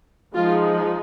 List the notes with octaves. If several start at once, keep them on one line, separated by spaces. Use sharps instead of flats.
F3 G#3 D#4 F4